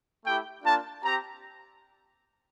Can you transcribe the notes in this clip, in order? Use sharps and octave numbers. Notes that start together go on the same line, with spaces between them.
A3 E4 G4 G5
A#3 D4 F4 A5
C4 G4 A#5